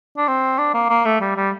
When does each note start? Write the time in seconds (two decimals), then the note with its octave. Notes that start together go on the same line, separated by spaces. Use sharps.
0.17 D4
0.28 C4
0.58 D4
0.74 A#3
0.90 A#3
1.05 A3
1.20 G3
1.36 G3